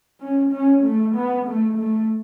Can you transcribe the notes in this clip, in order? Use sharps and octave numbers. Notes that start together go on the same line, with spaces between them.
C#4
C#4
A3
B3
A3
A3